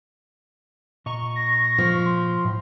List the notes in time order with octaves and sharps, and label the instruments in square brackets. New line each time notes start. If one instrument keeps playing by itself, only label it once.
[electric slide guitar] A#2 D#5 A#5 [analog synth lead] C#6
[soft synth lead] A#6
[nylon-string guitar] F3
[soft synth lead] C6
[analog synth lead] A2